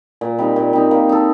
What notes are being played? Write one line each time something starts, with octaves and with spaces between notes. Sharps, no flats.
A#2
G3 C4 D#4
A#2
G3 C4 D#4
A#3
D#4 A4